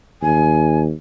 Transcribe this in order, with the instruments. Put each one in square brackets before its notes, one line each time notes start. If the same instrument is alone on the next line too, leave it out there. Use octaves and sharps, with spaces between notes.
[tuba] D#2 [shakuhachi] G#5